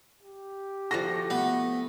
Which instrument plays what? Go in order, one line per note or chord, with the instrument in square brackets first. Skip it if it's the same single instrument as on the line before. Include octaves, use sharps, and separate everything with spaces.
[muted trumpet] G4
[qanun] F3 F#4 A4 [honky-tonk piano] A#6
[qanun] A3 [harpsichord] B3